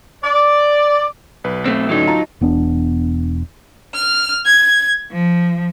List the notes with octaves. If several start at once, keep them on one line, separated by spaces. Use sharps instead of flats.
D5
B1 B4
A3 C4
A2 D3 F#3 C#4 D#4
F4 A5 A#5
E1 B3 D4
F6
G#6
F3